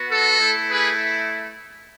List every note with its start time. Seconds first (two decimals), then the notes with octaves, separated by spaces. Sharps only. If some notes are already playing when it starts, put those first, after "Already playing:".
Already playing: B3 F#4
0.10 A4
0.39 A3 E4
0.69 G#4 B4